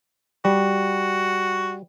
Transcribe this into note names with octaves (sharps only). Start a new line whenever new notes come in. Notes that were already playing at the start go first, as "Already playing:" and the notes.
G3 F#4